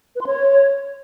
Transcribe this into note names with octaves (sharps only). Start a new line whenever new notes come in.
B4
C6
C#5